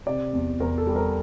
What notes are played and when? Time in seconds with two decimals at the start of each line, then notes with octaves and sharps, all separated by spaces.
0.06 C3 D5
0.33 E2
0.60 E2 A#4
0.78 A4
0.87 G3
0.96 A#4